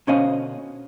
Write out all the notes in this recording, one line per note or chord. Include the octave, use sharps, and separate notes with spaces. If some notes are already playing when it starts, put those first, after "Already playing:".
B2 D3 C#4 C5 D#5 F5